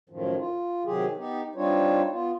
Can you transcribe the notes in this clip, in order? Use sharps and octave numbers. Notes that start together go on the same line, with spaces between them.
F#2 A2 D#3 F3
F4
C3 D#3 F#3 G4 G#4
B3 D#4 G4
G3 C4 D4 D#4 F4 C#5
B3 F4